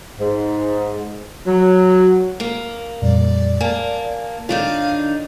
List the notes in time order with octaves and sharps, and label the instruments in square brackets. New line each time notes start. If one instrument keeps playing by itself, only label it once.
[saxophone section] G#2
F#3
[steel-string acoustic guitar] A#3
[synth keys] F2 A#2 G3 [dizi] D5
[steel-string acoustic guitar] A#3 [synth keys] G#5 A5
[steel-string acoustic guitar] D#3 D4 D#4 [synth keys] F4 A4 C#5 [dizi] F5